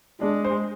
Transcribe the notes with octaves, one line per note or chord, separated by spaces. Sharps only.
G#3 D4
C5